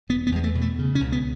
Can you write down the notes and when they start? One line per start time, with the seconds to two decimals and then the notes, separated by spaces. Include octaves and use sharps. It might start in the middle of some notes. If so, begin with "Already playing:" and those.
0.09 E1 B3
0.27 B3
0.32 E2 G#3
0.44 A3
0.55 B2
0.61 A3
0.79 C#3
0.95 C#4
1.00 C#2
1.12 B3